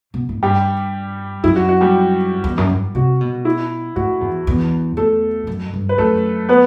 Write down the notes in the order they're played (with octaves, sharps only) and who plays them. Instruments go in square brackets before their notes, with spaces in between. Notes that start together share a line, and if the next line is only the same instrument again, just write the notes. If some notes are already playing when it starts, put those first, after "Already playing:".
[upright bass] B2
A2
[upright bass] G2 [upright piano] G3 G4
[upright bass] F#2 [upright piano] E4
[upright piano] F#4
F#4
G3 G4
[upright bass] E2
F#2
G2
[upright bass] C3 [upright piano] F#4
[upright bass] B2
[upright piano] E4
[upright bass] A2 [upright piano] F#4
[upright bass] E2
E2
[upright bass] E2 [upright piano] A3 A4
[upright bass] F#2
G2
[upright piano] B4
[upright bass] F#2 [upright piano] A3 A4
[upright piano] B3 B4